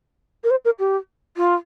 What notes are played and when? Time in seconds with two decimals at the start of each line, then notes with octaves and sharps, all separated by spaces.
0.44 A#4
0.51 C5
0.65 A#4
0.79 G4
1.37 F4